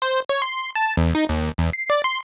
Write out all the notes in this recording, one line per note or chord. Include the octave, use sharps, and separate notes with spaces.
C5
C#5
C6
A5
E2
D#4
D#2
E2
C7
D5
C6